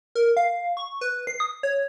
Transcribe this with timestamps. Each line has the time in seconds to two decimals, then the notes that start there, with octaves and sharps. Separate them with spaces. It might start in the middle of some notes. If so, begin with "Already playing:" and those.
0.15 A#4
0.37 F5
0.77 C#6
1.01 B4
1.27 C7
1.40 D#6
1.63 C#5